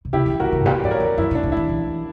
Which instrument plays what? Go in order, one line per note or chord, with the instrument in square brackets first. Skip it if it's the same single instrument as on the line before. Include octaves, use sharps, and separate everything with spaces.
[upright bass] B2
[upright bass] C#3 [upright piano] E4 G4
[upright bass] E3
[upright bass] D3 [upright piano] F#4 A#4
[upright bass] C#3
G2
[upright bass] A#2 [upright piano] G4 B4
[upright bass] G2 [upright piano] D5
[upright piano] A#4 C#5
[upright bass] F#2
[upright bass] F#2 [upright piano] E4
[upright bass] A#2
[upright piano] D4
[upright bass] A#2
[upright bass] E3 [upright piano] E4
[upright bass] E3